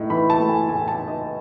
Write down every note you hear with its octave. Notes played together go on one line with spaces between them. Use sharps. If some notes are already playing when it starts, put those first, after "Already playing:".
Already playing: A2 D#4
E3 B5
A5
A3
G#5
A2 G#5
A5
D#4
D#5